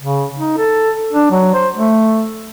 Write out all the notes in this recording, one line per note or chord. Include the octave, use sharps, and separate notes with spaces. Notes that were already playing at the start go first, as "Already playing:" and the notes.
C#3
D#4
A4
D4
F#3
C5
A3